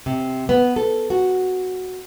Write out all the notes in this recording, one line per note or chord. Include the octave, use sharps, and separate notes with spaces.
C3
B3
A4
F#4